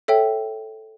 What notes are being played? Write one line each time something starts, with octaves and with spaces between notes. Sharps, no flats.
A4 C#5 E5 G5